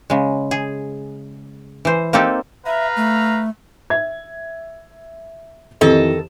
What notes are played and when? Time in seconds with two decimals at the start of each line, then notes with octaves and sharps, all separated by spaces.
0.10 C#3 G#3
0.51 G#4
1.85 E3 C5
2.13 A#3 C4 D#4 G4 A4
2.66 B4 E5 F5 A#5
2.97 A3
3.90 E5 G#6
5.81 F2 D#3 E3 G4 A4 D#5